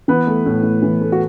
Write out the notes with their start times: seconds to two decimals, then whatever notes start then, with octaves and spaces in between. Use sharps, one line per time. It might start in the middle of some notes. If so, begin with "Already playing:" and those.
0.08 E3 B3 B4
0.27 A3
0.46 A2
0.63 A2
0.83 E3
1.01 A3
1.12 F#4